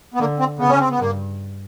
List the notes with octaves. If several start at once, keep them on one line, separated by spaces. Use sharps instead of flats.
B3
D3 A#3
C4
C#3 B3
C#4
C4
B3
G2 A#3